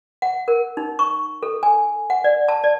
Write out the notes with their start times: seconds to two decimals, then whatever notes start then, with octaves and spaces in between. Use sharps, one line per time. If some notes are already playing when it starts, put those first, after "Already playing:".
0.22 F#5
0.48 A#4
0.77 D#4
0.99 C#6
1.43 A4
1.63 G#5
2.10 F#5
2.24 D5
2.48 A5
2.64 D5